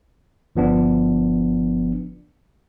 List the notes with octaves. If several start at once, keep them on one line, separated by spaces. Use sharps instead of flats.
G1 F3 B3 D4